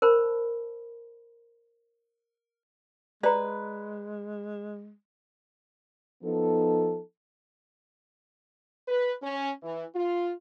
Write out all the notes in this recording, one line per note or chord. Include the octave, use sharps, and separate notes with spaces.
A#4 C5 A5 B5
G#3 B4 D5 A#5
F3 B3 D#4 A4
B4
C#4
E3
F4